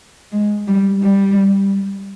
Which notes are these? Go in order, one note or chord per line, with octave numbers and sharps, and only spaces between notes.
G#3
G3
G3